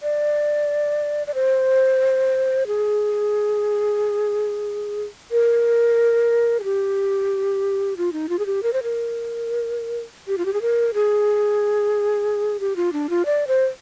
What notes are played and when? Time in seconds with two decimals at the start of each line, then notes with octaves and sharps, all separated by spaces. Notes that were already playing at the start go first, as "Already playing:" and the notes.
0.03 D5
1.27 D5
1.34 C5
2.67 G#4
5.31 A#4
6.60 G#4
6.64 G4
7.97 F4
8.13 D#4
8.29 F4
8.39 G#4
8.46 G4
8.63 A#4
8.73 C5
8.83 A#4
10.28 G4
10.38 F4
10.45 G4
10.53 G#4
10.62 A#4
10.94 G#4
12.60 G4
12.76 F4
12.93 D4
13.10 F4
13.25 D5
13.47 C5